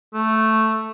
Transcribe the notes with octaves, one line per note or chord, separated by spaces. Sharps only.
A3